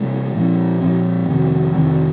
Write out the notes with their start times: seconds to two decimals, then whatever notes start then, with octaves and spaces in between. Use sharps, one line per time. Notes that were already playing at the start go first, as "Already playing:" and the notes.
Already playing: C3 G3 A#3
0.35 A#2 F3 C4
0.80 A#2 F3 C4
1.28 F2 C3 D#3 C4
1.74 F2 C3 D#3 C4